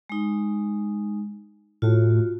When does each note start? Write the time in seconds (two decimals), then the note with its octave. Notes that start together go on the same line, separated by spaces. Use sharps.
0.10 G#3 D#4
1.82 A2 F4 F#4